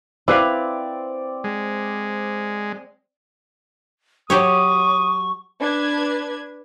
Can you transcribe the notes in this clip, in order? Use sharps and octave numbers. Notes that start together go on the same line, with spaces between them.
C4 E4 B4 D5 F5
G#3
F#3 G4 C#5 C#6 D#6
D4 B4 G#6